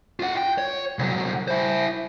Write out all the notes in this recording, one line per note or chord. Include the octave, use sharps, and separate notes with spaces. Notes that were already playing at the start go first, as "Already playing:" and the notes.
F4 F#5
G5
C#5
C2 F#3
E4 C5